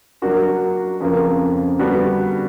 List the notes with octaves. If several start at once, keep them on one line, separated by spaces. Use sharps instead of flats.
F#3 A#3 D4 F#4 A#4
F2 C#3 F3 A#3
D3 G3 B3 D4 F#4